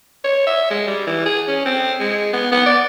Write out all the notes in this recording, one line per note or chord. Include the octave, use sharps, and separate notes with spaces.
C#5
E5
G#3
G3
E3
G#4
C#4
C4
G#3
B3
B3
D5